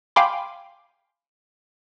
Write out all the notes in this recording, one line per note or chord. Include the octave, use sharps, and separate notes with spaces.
F5 G5 G#5 B5 C6 D6